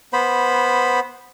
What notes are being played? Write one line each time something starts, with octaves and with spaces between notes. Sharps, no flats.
B3 C5 B5